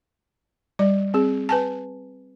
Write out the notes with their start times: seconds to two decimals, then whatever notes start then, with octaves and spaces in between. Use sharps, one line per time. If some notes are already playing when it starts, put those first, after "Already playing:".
0.79 G3 D5
1.14 C4 G#4
1.49 B4 G#5 A5